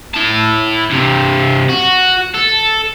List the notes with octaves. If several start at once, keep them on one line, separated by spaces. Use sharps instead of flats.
E4 A5
G2 C3
F#4
A4